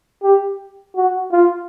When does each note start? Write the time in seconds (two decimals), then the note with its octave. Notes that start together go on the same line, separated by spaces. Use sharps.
0.23 G4
0.95 F#4
1.32 F4